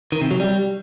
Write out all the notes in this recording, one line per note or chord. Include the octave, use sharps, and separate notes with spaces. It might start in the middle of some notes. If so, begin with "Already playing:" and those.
D#3
C3
F#3
G3